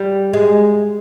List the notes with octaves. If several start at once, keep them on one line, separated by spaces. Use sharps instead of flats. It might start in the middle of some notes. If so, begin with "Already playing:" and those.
Already playing: G3
G#3